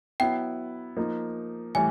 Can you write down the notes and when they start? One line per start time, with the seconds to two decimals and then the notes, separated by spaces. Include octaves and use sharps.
0.20 F#3 B3 E4 G5
0.97 F3 A#3 D#4
1.75 A2 E3 G3 G#5